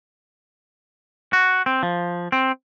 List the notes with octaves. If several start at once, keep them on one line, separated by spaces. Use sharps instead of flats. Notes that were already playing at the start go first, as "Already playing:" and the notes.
F#4
C4
F3
C4